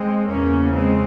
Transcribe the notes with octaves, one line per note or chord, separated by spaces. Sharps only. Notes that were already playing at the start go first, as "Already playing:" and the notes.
Already playing: G#3 C4
E2 C#3 A#3 C#4
G#3 C4